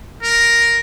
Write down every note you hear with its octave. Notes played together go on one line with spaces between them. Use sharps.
A#4